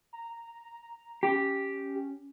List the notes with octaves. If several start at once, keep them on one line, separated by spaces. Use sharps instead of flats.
A#5
C#4 G4